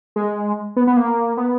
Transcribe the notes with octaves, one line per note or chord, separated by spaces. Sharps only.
G#3
B3
B3
A#3
B3